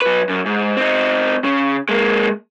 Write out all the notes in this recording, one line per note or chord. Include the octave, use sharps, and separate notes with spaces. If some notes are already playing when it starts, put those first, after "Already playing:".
F#3 B4
F#2
G#2
C4 D#4
C#3
G#3 A#3